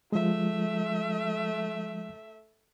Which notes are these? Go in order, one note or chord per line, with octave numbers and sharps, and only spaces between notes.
F3 G#3 A3 E5